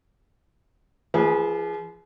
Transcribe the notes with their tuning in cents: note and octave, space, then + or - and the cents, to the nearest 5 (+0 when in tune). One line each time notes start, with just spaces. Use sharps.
F3 -35 G#4 +0 B4 -35